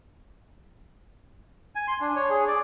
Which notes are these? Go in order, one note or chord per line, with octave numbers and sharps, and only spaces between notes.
G#5
C6
D4
C#5
G#4
D5